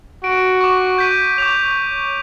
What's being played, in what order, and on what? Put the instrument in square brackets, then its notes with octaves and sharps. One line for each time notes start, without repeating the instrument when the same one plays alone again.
[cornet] F#4 [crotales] D7
[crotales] C#6 D6
G6 B6 D#7
[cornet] C#5 [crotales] D6 G6 F7